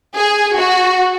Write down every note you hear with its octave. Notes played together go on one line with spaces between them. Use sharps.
G#4
F#4